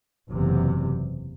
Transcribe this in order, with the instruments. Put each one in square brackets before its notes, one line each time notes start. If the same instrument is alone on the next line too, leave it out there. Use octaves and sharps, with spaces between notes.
[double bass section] F#1 E2 C3